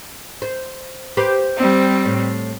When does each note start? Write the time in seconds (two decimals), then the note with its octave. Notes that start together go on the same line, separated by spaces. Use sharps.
0.42 C5
1.17 G4 B4 C5
1.56 G3 C4
2.05 A2